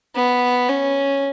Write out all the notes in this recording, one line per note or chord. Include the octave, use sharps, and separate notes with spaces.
B3
C#4